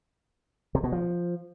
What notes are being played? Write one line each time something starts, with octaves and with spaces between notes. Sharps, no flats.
C3
B2
F3